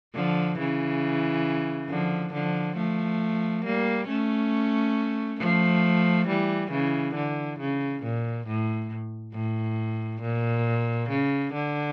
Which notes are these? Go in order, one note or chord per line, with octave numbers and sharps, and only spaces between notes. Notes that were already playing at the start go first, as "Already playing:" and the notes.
D3 F3
C#3 E3
D3 F3
D3 F3
F3 A3
G3 A#3
A3 C#4
F3 A3
E3 G3
C#3 E3
D3
C#3
A#2
A2
A2
A#2
C#3
D3